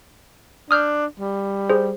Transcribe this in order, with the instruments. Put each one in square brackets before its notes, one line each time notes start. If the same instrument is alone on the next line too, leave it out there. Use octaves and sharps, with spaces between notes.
[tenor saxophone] D4 [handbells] D#6 F6 G6
[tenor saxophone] G3
[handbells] G#4 C5